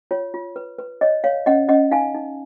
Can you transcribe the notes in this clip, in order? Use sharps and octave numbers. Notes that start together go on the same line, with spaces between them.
F4 C#5
F4
B4
B4
C#5 D#5
C#5 F5
C#4 D#5 F#5
C#4 D#5 F#5
D#4 F5 G#5
D#4